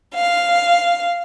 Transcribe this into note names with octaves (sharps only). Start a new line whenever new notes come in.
F5